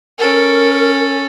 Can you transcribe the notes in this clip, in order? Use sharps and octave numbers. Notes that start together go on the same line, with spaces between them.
C#4 A4 A#4